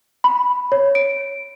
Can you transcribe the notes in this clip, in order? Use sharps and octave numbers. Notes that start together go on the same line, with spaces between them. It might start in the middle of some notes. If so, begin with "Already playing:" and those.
B5
C#5
D7